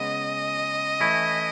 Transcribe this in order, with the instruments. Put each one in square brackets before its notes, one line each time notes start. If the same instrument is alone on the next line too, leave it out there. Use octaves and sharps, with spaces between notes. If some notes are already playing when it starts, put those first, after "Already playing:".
Already playing: [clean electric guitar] C#3 G#3 B3 [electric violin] D#5
[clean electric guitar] E3 A3 C#4 E4